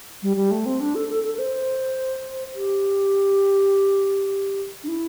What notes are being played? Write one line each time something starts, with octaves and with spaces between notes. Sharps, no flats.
G3
G3
A3
C4
D4
A4
A4
A4
A4
C5
G4
D4
E4